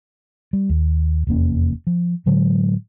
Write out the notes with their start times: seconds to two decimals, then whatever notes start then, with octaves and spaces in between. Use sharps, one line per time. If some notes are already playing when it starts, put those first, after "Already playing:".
0.53 G3
0.69 D#2
1.27 F1 E2 A#3 C#4
1.87 F3
2.26 A2 D3 F#3 G#3